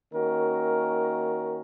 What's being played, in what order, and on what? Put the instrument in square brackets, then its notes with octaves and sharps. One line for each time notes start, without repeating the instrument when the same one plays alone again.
[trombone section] D#3 A#3 C#4 F#4 A#4